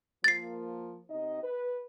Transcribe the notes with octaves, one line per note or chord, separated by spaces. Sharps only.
F3 A#3 A6 C7
C3 D#4 D#5
B4